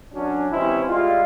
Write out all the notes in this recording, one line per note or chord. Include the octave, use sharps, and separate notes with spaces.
F#2 F#3 C#4 D4
C3 E3 G#3 C#4 E4 C5
G3 G#3 E4 F4